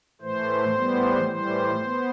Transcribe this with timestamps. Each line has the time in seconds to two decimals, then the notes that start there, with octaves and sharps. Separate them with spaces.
0.21 A2 E3 A3 C5
0.75 A2 E3 G3 B3
1.28 A2 E3 G3 C5
1.82 B3